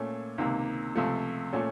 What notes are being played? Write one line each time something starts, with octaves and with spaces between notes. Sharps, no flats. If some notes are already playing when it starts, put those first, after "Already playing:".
Already playing: A#2 A3 C#4
C#2 C3 D#3 A#3
C#2 C3 F3 A3
A#2 A3 C#4